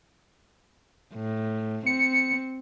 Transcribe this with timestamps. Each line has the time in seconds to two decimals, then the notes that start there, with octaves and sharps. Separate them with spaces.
1.14 A2
1.86 C4 C#7